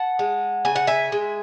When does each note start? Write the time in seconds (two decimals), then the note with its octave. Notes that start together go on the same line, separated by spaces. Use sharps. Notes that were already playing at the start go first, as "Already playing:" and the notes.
Already playing: F#5 A5
0.19 G#3
0.65 C#3 G#5
0.76 F#5
0.87 E5 G#5
1.12 G#3